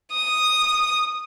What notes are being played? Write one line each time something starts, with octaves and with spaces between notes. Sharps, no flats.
D#6